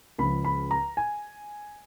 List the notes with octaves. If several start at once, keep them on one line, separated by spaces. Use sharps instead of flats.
C#2 C#3 F3 B5
B5
A#5
G#5